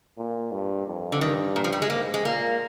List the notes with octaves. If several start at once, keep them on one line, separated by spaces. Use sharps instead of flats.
A#2
G2
F2
D3
G2 D#3
A#2
F3
G3
G#3
G#2 A#3
G#3
A#2 A#3